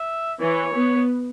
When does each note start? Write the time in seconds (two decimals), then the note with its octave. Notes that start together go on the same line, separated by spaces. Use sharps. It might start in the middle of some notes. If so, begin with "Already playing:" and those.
Already playing: E5
0.40 E3 C#5
0.75 B3